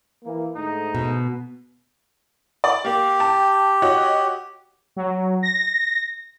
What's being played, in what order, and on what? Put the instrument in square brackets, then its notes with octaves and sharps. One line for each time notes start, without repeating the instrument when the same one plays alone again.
[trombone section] E3 A#3
[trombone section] G#2 D3 A3 [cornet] D#4
[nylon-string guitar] B2
[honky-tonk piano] D5
[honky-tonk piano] A#3 [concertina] G4
[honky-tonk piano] G5 A5
F#4 C#5 D#5
[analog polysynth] F#3
A#6